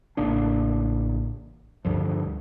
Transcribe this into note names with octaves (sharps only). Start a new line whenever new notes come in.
A1 C#3 A#3 D4
D2 G2 F3